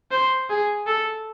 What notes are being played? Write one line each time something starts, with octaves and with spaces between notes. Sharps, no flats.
C5
G#4
A4